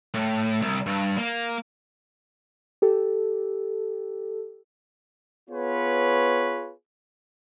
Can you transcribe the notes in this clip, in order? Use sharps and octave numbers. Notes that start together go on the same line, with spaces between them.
A2
C2
G2
A#3
G4 A4
B3 F4 G#4 B4 C#5